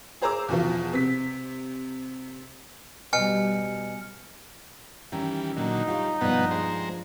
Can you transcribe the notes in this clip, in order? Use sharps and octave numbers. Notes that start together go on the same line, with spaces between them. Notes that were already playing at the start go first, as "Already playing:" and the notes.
G#4 C5 A#5 D6 E6
E2 B2 F3
C3 B6
B2 G3 G#5 F6 C#7
D#3 E3 G3 C#4
A#2 D3 F#3 D#4
G3 F4 C#5
G2 B2 F3 B3 F#5
G#3 C5 A#5